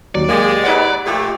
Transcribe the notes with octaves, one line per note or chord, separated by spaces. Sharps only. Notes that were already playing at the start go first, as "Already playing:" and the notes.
D#2 F#3 D5
G#3 A#3 G4
D#4 B4 C#5 F#5
A#2 F3 A3 G4